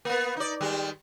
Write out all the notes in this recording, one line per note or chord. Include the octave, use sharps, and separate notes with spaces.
A#3 B3
D#4 D5
D#3 G3 G#3